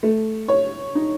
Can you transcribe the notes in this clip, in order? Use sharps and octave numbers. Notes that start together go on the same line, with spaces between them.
A3
C#5
D#4